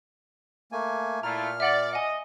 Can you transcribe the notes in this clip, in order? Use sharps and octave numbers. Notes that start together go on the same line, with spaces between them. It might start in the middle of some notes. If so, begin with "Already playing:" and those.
A3 A#3 G#5
A#2 A3 E4 F4 A#5 F6
D5 E5 F#5 F#7
D#5 F#5 G#5